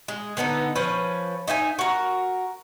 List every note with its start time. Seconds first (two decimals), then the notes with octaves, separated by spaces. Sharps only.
0.08 G#3
0.37 D3 B3 D#4 A4
0.75 F3 C#4 B4
1.47 D#4 E5 F#5 G#5
1.79 F#4 A#4